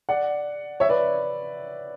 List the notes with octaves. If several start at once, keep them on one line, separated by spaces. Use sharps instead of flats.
D5 F#5
C#5 E5
B4 D5